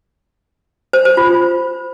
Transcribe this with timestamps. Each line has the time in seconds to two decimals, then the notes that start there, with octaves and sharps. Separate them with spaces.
0.93 C5
1.05 C5
1.17 F4